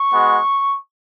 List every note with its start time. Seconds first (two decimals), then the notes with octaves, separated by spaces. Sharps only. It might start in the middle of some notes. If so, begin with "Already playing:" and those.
Already playing: C#6
0.11 G#3 B3 F#4